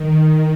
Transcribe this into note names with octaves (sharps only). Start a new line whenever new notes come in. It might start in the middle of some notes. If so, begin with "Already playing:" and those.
Already playing: D#3